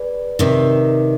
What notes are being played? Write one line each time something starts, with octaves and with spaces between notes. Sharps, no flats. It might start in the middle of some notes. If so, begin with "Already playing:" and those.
Already playing: G#4 B4 D5
C3 D#3